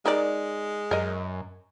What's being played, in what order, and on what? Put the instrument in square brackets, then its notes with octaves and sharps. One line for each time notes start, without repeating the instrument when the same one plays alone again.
[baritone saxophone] G#3 [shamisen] D#4 A#4 D5
[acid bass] F#2 [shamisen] A#4 D#5